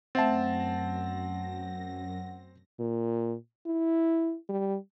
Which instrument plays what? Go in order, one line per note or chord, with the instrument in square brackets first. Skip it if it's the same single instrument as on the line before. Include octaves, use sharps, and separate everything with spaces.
[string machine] F#2 A#6 [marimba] A3 E5 A6 [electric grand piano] C4 A5 [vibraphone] F#5
[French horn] A#2
E4
G3